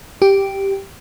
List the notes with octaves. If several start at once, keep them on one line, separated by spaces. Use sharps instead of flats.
G4